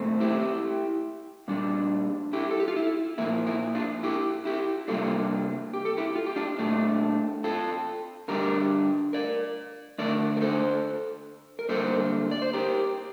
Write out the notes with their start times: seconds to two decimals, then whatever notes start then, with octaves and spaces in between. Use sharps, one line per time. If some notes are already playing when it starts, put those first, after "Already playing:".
Already playing: A#2 A3 C4
0.20 E4 G4
1.48 A#2 G3 D4
2.33 E4 G4
2.51 A4
2.60 G4
2.68 F4
2.76 E4
3.18 A#2 F3 A#3 E4
3.47 E4
3.75 D4 F4
4.03 E4 G4
4.45 E4 G4
4.88 C3 G3 A#3 D4 F4 A4
5.74 G4
5.85 A4
5.97 E4 G4
6.16 F4
6.27 G4
6.36 D4 F4
6.58 A#2 A3 D4
7.44 F4 A4
8.28 D3 G3 D4 G4 A#4
9.13 A#4 D5
9.98 D3 A3 D4 A#4 D5
10.37 A#4
10.41 A4 C5
11.59 A#4
11.69 D3 G3 A#3 A4 C5
12.31 D5
12.42 C5
12.53 G4 A#4